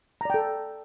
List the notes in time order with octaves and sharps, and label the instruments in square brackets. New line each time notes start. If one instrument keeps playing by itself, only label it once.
[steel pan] A#5
D5
G5
A4